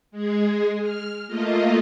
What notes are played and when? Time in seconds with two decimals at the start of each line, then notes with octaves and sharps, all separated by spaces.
0.11 G#3 G#4
0.81 F6
1.28 A3 A#3 F4 D#5